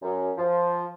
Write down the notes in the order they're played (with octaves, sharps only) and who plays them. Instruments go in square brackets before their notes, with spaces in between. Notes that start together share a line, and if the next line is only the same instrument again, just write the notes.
[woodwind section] F#2
F3